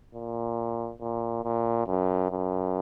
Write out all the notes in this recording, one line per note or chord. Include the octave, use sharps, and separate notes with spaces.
A#2
A#2
A#2
F#2
F#2